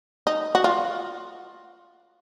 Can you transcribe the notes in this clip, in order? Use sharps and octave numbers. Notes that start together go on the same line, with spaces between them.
D#4
F#4
F4